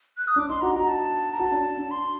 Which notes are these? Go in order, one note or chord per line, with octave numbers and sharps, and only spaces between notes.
F#6
D#6
D4
D6
D#4 C6
F#4 A#5
F#4 A#5
A5
A#5
F#4 A5
D4
D4
C6